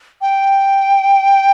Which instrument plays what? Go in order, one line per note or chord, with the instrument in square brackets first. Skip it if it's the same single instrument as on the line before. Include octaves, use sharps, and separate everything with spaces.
[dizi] G5